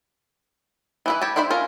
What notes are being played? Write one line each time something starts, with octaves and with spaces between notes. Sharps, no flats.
E3 E4 B4
G4 C#5 A5
D4 E4 C5 E5 B5
C#4 F4 A#4